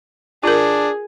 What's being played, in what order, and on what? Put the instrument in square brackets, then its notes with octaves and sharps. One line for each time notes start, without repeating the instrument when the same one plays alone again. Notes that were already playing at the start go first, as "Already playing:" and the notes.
[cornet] D4 [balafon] F4 A#4 [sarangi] G#4